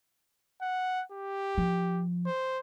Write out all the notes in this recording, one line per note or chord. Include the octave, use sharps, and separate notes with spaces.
F#5
G4
F3
C5